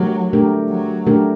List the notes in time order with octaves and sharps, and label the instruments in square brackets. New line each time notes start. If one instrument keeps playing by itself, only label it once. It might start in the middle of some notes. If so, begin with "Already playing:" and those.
Already playing: [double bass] F#3 [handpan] A3 D4 G4 A#4
[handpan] A3 D4 G4 A#4
[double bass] F#3
[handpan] A3 D4 G4 A#4